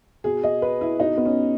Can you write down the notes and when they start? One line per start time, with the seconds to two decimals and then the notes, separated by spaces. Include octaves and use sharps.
0.24 B2 G#4
0.43 D#5
0.62 B4
0.81 E4
1.00 B2 D#4
1.17 B3
1.25 C#4